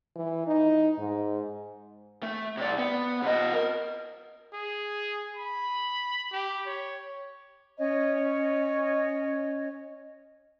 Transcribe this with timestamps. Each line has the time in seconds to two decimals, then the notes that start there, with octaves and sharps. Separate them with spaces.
0.15 E3
0.47 D#4
0.98 G#2
2.23 A3
2.57 C3 D5
2.78 B3
3.22 C3 D#5
3.53 A#4
4.54 G#4
5.37 B5
6.32 G4
6.66 C#5
7.77 C#4 C#5 D#5